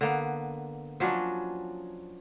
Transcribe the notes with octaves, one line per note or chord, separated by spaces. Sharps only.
D3 A#3 B3
F3 F#3 C#4 D4